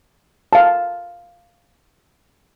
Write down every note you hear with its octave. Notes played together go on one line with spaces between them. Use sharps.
F5 A5